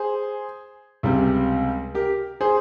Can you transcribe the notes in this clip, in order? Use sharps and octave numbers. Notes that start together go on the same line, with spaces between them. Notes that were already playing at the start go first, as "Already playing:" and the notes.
Already playing: G#4 C5
C#2 C3 G3
G4 A#4
G#4 C5